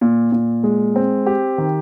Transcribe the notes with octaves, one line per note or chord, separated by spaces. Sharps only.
A#2
A#2
G#3
C4
G4
D#3